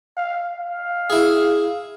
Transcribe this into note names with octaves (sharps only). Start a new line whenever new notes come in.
F5
F5
E4 G#4